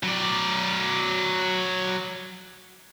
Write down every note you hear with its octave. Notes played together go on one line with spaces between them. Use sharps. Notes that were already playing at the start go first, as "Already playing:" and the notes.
F#3 D5